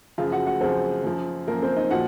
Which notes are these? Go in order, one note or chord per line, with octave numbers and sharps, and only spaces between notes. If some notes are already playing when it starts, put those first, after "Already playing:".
F#2 C#3 F3 F4 F5
F#4 F#5
F#4 F#5
F#2 C#3 F3 C4 C5
F#2 F3
F#2 F3 A#3 A#4
C4 C5
D#4 D#5
A#2 F3 F#4 F#5